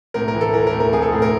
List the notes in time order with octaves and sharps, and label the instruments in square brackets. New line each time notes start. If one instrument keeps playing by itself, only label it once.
[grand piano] A2 A#4
A#4
E3
A4
E3 A#4
A#4
A2
A#4
A2 G#4
A4
A2
A#4